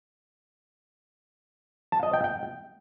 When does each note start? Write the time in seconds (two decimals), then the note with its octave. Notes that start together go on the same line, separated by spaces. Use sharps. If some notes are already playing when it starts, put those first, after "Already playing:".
1.92 A5
2.03 D#5
2.13 G5
2.24 G5